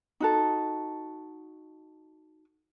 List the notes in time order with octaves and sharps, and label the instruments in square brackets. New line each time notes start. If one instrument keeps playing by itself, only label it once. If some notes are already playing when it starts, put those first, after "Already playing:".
[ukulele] D#4 F#4 A4